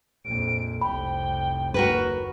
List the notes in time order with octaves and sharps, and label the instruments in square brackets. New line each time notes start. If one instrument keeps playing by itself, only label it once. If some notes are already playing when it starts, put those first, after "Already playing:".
[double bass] A#1 F2 [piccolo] D7
[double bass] F1 C2 [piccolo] G5 [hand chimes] B5
[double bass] F#1 D#2 [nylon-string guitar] F#4 A#4 B4